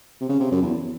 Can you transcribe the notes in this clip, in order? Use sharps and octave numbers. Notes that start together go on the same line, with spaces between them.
C3
C#3
C3
F#2
E2